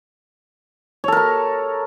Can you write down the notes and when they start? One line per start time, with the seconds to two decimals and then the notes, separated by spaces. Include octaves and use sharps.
1.04 C#5
1.08 A4
1.12 A#4
1.17 A#5